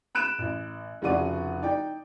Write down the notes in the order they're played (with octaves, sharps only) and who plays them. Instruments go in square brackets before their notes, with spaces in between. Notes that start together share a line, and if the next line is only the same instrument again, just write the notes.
[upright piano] B5 F#6 D7 E7
A1
F1 C#3 F3 F#4 D5 D#7
D#4 D5 G5